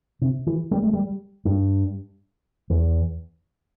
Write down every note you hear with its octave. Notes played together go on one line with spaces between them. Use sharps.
C3
E3
G3
A3
G3
G2
E2